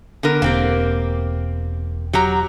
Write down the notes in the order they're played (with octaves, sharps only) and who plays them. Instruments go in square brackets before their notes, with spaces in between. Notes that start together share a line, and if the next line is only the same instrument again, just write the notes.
[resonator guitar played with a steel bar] D3 B3 A#4
[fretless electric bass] E1 [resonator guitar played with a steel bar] A#3 C4 G4
[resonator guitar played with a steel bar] F#3 G4 A#5